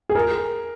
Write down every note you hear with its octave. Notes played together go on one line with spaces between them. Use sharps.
G#4
A#4